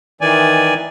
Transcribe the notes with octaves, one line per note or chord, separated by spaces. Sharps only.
D#3 E3 D5 G#5